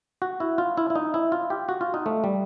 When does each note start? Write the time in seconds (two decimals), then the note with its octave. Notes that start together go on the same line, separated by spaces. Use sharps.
0.22 F#4
0.40 E4
0.58 F4
0.77 E4
0.90 E4
0.95 D#4
1.14 E4
1.32 F4
1.50 G4
1.69 F#4
1.81 F4
1.94 D#4
2.06 A3
2.24 G3